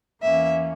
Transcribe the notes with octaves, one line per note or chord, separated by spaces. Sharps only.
E2 E3 A#3 C#4 E5